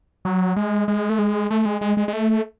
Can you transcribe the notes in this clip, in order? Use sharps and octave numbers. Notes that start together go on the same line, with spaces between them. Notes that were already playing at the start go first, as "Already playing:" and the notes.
F#3
G#3
G#3
A3
G#3
A3
G#3
G#3
G#3
G#3
A3